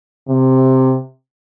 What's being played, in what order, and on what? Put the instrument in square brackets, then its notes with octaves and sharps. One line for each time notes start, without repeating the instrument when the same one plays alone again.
[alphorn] C3